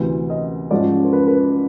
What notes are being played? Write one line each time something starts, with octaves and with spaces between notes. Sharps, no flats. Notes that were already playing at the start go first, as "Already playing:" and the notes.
Already playing: D2 C3 E3
D#5
G#2 F3 G#3 C#4 D5
C5
B4
B4